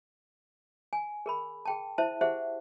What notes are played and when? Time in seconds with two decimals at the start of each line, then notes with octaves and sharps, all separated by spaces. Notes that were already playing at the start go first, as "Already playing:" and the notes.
0.93 G#5
1.26 G#4 A#4 B5
1.65 G#4 G5 A5
1.98 E4 C5 E5 A5
2.21 G4 G#4 C5 E5 F#5